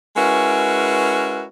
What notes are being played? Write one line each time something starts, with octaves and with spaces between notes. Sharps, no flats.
G#3 C#4 E4 F#4 A#4 B4